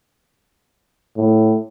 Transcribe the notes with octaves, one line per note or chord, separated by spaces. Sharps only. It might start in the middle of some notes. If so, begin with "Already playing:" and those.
A2